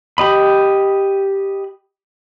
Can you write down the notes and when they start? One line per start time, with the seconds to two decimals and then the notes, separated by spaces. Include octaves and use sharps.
0.18 G4 D#5 B5